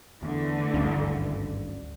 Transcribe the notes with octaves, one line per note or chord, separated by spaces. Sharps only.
E2 D3 E3 A3
G#1 D2 G2 C#4